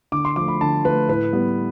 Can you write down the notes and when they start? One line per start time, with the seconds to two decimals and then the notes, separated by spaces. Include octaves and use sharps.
0.12 D3 D6
0.25 C6
0.36 F3 A3 D6
0.48 B5
0.61 D3 A5
0.84 F3 A3 B4
1.09 A2 B4
1.33 G3 B3